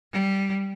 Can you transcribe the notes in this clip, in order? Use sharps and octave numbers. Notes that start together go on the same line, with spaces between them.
G3